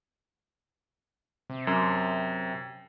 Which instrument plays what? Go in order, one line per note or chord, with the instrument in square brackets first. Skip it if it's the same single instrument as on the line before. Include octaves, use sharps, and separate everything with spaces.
[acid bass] C3
[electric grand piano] F#2